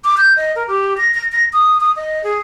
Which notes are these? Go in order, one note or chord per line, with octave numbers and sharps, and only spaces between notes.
D6
G6
D#5
A#4
G4
A#6
A#6
A#6
D#6
D#6
D#5
G#4